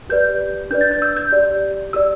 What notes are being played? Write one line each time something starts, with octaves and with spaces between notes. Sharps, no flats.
G4 B4 D5 G6
D4 B4 D5 G6
A6
G6
E6
G6
G4 D5
G4 D5 E6